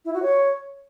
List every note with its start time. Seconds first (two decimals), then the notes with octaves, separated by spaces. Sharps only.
0.04 E4
0.13 F#4
0.22 C#5